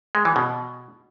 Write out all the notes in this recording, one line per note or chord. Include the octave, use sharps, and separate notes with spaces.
G#3
E3
B2